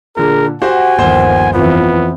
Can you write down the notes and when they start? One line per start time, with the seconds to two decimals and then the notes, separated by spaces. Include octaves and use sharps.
0.17 A#2 D3 G#4 A#4
0.62 F#4 G4 C5 F#5 G#5
0.98 G1 D#2 F3 C5 G7
1.53 F2 E3 B3 F4